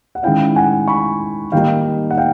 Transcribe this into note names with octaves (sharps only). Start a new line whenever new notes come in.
F#5
D#3 G#3 C#4 E4 F5 G5
F#5 G#5
B5 C#6
D#3 G3 A#3 D#4 F5 G5
F#5
F5 G5